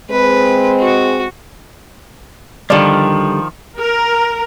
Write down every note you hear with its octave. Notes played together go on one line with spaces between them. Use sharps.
G#3 C4 B4
F#4
D3 D#3 F3 G3 D5
A#4